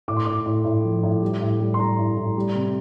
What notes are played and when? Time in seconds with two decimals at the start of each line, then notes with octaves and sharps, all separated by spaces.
0.08 A2 D6
0.17 C6
0.25 A2 D6
0.46 A2
0.65 A2
0.84 F3
1.03 A2
1.21 G3
1.41 A2
1.60 G3
1.74 C6
1.79 G3 A#5
1.98 A2
2.17 A2
2.37 G3
2.55 C3